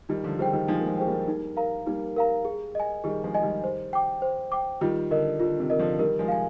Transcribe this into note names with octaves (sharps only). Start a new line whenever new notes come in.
D#3 G3 D#4
D3 F3
D#3 G3 G#4 C5 G5
D#3 G3
F3 G#3 D#4
A#3
F3 G#3
G#4 C5 G5
G3 A#3
D#4
A#4 F5 A#5
G3 A#3 D#4
A#4 F5 A#5
G#4
D#5 G#5
D#3 G3 G#4
F3 G#3
D#5 G#5
D#3 G3
C5
G5 D6
C5
G5 D6
D#3 G3 F4
D3 A#4 D#5
D3 F4
C3 D#3
A#4 D#5
D3 F3
D#3 G3 A#4
F3 G#3
F5 G#5